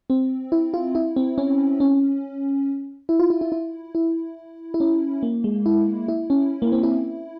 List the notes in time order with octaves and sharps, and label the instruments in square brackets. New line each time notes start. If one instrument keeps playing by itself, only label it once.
[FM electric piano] C4
E4
F4
E4
C4
C#4
C#4
E4
F4
E4
E4
E4
E4
E4
C#4
A#3
G#3
E4
E4
C#4
A#3
C4
E4